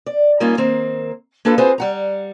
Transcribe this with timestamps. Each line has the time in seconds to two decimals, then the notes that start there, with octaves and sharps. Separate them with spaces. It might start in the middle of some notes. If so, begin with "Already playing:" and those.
0.06 D5
0.40 G3 A#3 C#4 D#4 F4
0.57 D#3 A#3 C4
1.45 A#3 D4 F4 A4 B4
1.58 C4 F4 F#4 G#4 B4 C5
1.78 G3 F#5 A#5